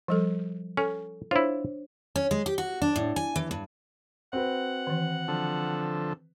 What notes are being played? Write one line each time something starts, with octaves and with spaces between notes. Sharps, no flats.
F3 G3 A4
C#4 A4
D4 E4 F4 C5 C#5
C#4
G#3
G4
F#4
D4
A2
G#5
E3
G2
C4 F#4 B4 F#5
D#3 E3
D3 F3 A4